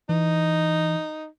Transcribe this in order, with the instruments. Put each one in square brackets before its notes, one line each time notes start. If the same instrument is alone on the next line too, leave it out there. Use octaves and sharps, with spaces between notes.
[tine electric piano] E3 [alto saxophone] D#4